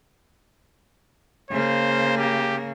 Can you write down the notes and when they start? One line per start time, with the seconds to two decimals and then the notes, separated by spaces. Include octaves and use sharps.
1.51 C#3 A#3 C5
2.18 G4